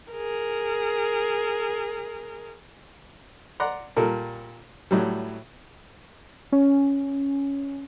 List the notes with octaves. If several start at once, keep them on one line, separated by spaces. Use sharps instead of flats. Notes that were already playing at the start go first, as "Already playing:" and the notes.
G#4 A#4
D5 F#5 A#5 C6
A#2 G3 A4 A#4
A2 F#3 G3
C#4